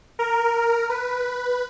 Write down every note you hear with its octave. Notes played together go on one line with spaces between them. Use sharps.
A#4
B4